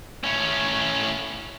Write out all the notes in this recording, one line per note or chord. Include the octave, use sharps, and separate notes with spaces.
A2 C#4